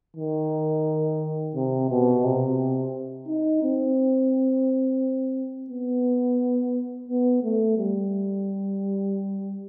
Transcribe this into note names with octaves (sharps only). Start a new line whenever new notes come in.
D#3
C3
B2
C3
D#4
C4
B3
B3
A3
G3